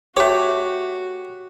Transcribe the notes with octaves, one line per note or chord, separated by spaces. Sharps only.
A3 F#4 G4 C#5